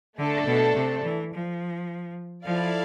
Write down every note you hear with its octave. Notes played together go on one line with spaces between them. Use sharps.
D3 A3 D4 A4
B2
C3
E3
F3
F3 E4 A4 D5 F5